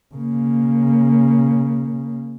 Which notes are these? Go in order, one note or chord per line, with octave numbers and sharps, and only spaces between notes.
C#3 A#3